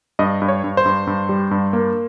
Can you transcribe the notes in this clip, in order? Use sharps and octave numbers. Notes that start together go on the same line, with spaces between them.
G2 D#5
G2
C#5
G2
C5
G2
G2
G3
G2
A#3